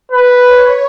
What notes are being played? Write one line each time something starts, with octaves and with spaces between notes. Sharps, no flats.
B4
C#5